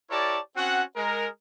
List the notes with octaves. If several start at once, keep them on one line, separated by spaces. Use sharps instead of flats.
E4 G4 A#4 C#5 D5 A5
C4 C#4 F#4 F#5
G#3 A#4